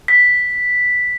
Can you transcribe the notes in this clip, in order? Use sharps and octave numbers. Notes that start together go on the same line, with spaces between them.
B6